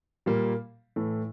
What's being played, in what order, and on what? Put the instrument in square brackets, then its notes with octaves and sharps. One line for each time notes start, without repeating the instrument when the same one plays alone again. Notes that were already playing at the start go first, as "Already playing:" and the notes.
[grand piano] A#2 G3 A#3
A2 E3 A3